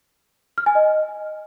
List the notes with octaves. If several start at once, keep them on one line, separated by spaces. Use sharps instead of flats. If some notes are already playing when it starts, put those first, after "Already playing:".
F6
G#5
D#5